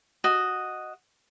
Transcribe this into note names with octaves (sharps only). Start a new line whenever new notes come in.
F#4 D#5